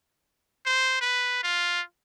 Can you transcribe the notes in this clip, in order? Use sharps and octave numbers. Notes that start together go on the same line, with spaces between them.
C5
B4
F4